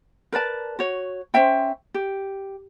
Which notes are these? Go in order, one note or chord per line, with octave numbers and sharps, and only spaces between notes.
A#4 B4 D5 A5
F#4 C#5
C#4 C5 E5 G5
G4